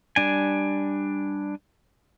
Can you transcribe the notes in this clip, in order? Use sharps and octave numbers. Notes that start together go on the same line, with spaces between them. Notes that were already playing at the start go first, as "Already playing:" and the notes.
G3 D4 G#5